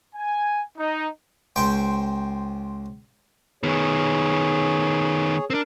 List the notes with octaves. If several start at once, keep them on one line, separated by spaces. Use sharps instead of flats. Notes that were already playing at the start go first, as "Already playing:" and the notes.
G#5
D#4
C#2 C5 G5 C#6
D#3 B3 G#4 C#5
C4 D4 A#4